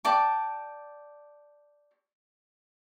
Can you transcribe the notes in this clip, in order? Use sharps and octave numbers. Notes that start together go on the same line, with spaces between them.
D5 G5 A5 D6